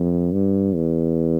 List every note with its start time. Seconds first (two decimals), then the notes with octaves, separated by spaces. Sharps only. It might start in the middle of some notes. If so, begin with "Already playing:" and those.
Already playing: F2
0.32 G2
0.75 E2